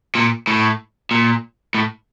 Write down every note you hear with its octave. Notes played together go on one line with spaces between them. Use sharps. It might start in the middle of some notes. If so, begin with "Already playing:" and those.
A#2
A2
A#2
A2